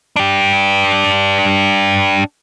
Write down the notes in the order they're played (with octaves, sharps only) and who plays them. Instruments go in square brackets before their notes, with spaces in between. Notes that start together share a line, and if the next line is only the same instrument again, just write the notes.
[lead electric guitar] D4 G4